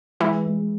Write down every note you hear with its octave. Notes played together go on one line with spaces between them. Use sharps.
E3 G#3
G#3